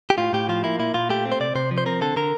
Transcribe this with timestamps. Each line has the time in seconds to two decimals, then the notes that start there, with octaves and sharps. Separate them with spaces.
0.10 G4
0.18 A2 F4
0.33 A2 G4
0.49 F3 F4
0.64 A#3 E4
0.79 A#2 E4
0.94 A#2 F4
1.09 A3 G4
1.25 C4
1.32 C5
1.40 C3 D5
1.55 C3 C5
1.71 F3
1.78 C5
1.86 C4 A#4
2.02 D3 A4
2.16 D3 A#4